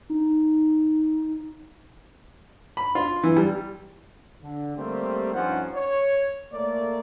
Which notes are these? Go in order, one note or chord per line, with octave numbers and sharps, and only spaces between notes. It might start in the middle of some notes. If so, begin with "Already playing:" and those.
D#4
B5
F4
E3
G3
D3
G3 A3 A#3 C4 G4 C5
G2 F3 C#4 D#4 C5 F#5
C#5
A3 A#3 D5